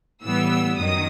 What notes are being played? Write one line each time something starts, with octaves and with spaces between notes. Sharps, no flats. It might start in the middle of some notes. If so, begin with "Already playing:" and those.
A2 E3 G3 B3 E6
F#2 D#3 D#6